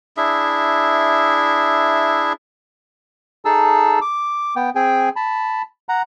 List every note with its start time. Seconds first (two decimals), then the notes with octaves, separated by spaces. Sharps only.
0.17 D4 E4 G#4 E5
3.45 D#4 G#4 A4 A5 E6
4.02 D6
4.56 B3 G5
4.75 C4 G#4 G5 G#5
5.16 A5 B5
5.89 F#5 A#5